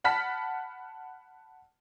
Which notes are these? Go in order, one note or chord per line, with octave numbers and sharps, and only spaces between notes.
F#5 A5 B5 F6 B6